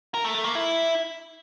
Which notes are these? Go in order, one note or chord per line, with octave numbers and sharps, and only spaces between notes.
A#4
A3
A3
A#3
E4